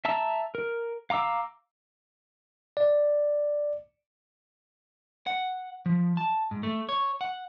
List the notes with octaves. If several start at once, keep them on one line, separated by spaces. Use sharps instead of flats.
E5 A5 A#5 E6
A#4
F5 A#5 D6 E6
D5
F#5
F3
A5
G#2
A3
C#5
F#5